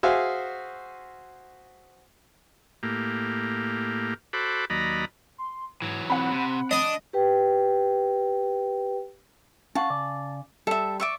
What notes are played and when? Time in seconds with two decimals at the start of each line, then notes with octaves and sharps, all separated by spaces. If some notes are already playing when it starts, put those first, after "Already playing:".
0.03 F#4 G#4 C5 E5 F5 G#5
2.83 A2 A#3 G4
4.33 F#4 A4 C5 B5 D6
4.70 D#2 F#3 D5 D#5 A#5 B5
5.38 C6
5.82 G#2 E3 F#3
6.10 C4 F#5 B5
6.32 C3
6.71 D4 D#5
7.13 G4 B4 G5
9.75 C#4 F5 F#5 A5
9.90 C#3 D5
10.67 G3 A4 E5
11.00 D5 E5 C#6